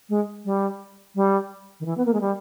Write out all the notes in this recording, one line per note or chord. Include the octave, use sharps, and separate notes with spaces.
G#3
G3
G3
D#3
E3
B3
A#3
G#3
G3